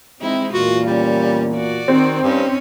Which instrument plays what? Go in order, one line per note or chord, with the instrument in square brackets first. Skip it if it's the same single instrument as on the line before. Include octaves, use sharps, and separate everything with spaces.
[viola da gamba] G#3 D#4 E4 [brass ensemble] C4
[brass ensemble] E2 A#2 [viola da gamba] F4 [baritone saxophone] F#4
[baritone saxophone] G3 [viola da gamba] C#4
[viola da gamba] F#4 D5
[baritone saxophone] D#3 [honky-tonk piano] C4
[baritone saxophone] G2 [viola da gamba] C#4 D#4